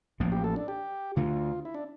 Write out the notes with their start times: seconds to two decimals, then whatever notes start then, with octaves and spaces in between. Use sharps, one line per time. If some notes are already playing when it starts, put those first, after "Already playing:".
0.20 A1 A2 F3 A#3
0.32 G4
0.44 A4
0.56 D4
0.68 G4
1.16 D2 D3 A3 F4
1.65 E4
1.74 D4